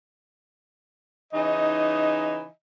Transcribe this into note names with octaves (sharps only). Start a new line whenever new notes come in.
C#3 E3 D#4 D#5